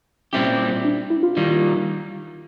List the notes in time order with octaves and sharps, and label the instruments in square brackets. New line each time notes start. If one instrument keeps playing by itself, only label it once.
[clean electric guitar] A#2 G3 C4 E4 G4 [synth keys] C#4
[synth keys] D4
E4
F4
[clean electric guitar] D#3 G3 A#3